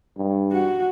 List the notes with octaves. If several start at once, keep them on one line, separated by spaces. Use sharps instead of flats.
G2
F#4